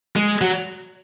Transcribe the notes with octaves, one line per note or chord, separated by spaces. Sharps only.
G#3
F#3